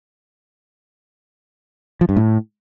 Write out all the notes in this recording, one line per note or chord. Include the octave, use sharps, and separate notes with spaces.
F3
G2
A2